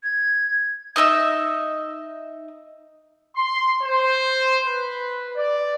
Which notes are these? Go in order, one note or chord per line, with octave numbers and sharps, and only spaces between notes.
G#6
D#4 D#5 E5 E6
C6
C5
B4
D5